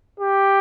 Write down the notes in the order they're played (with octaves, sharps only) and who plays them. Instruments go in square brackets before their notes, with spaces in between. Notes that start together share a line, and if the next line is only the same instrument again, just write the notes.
[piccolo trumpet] G4